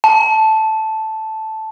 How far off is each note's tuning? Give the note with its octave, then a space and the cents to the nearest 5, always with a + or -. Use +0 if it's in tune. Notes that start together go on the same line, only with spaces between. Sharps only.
A5 -5